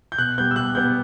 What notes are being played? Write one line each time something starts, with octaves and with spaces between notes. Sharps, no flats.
G6
B2 F#6
G3 B3 G6
E6
B2 F#6
G3 B3 G6